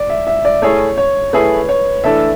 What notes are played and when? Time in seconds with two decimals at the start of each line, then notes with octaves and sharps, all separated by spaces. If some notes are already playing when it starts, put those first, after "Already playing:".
Already playing: D5
0.10 E5
0.27 E5
0.45 D5
0.62 A3 E4 G#4 C#5
0.98 C#5
1.33 A3 E4 G#4 B4
1.69 C#5
2.04 E3 A3 D4 A4 D5 E5